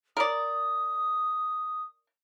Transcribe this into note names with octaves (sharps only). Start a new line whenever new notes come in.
A#4 D5 D#6